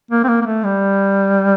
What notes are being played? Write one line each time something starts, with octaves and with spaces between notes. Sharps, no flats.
A#3
C4
A#3
A#3
A3
G3